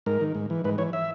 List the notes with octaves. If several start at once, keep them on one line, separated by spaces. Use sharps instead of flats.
G#2 A#4
D#3
G#2
E3
G#2 B4
E3 C#5
E5